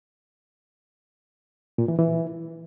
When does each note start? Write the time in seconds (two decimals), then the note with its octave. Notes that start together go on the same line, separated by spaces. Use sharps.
1.78 A#2
1.88 E3
1.98 E3